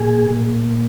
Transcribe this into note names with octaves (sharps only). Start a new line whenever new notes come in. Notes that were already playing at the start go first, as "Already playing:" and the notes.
Already playing: A#2 G#4
A#2